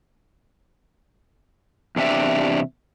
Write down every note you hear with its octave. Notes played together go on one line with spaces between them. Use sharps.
E2 C3 D4 G4 E5